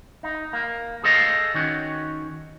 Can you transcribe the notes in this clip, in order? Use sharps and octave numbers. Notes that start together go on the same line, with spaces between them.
D#4
A#3
G#4 A4 C5 D#5 F5
D#3 C#4 F#4